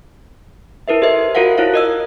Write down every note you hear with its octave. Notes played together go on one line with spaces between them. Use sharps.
E4 A#4 B4 E5
G4 A4 C5 D#5 E5
F4 F#4 A#4 C5 F5 F#5
E4 F4 C#5 F5
A#4 D#5 E6